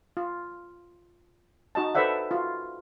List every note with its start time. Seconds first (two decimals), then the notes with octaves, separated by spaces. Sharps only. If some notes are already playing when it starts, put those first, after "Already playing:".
0.17 F4
1.75 D#4 F#4 D#5 A5
1.95 A4 B4 C5 D5 E5 F#5
2.31 F4 F#4